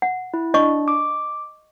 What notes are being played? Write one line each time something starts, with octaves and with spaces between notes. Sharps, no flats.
F#5
E4
D4 D#5 C#6
D6